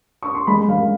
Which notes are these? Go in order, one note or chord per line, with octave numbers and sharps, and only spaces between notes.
C#6
C6
G#3 B5
G#3 F5